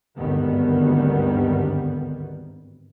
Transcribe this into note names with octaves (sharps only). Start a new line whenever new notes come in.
G#1 D2 G2 D#3 G3 B3